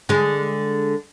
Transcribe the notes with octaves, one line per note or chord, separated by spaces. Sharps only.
D3 G#3